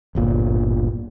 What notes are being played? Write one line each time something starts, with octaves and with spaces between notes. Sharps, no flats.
D1 G1 A#2